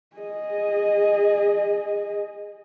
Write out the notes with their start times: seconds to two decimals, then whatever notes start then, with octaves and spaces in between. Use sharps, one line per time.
0.16 G#4 D#5